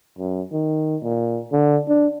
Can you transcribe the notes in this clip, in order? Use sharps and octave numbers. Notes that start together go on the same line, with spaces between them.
F#2
D#3
A#2
D3
D4